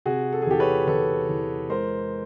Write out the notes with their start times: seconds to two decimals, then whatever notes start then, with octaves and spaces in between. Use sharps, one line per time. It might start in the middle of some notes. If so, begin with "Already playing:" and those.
0.05 C3 F#4 G#4
0.33 A4
0.42 G#4
0.47 E2 G4 A4
0.60 B4 C#5
0.87 E2 A4 B4
1.29 E2
1.70 G#3 A#4 C5